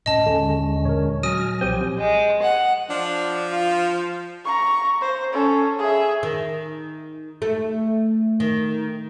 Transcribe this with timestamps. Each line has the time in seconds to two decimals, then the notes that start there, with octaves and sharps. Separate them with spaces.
0.06 D1 A2 C#4 D#5 A5
0.26 D#2 D3 G#3 C#4
0.85 A#2 A#4 C#5
1.23 F#3 G#5 D#6 F6 A#6
1.61 B1 F3 C4 G4 G#5 G6
1.98 G#3
2.42 F#5
2.90 F3 D4
3.52 F4
4.45 A#5 C#6
5.01 C5
5.33 C#4 A4
5.79 G#4 E5
6.23 D#3
7.42 A3
8.40 D#3